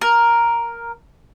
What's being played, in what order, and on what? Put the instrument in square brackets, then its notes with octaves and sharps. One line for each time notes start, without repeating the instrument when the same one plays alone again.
[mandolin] A#4